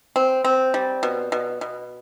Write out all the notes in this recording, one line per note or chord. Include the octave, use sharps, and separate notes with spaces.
C4
C4
G3
B2
B2
B2